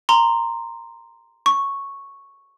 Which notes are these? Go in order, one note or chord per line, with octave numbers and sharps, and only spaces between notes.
A#5 C6
C#6